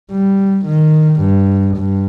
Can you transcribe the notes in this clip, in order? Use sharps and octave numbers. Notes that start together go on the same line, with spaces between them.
G3
D#3
G2
G2